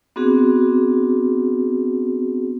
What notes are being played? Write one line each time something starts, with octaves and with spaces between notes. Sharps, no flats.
B3 C4 D4 F#4 G#4